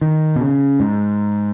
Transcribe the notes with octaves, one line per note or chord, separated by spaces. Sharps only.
D#3
B2
C#3
G#2